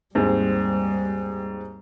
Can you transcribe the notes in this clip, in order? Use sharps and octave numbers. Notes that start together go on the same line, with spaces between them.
D#2 G#2 G3 C4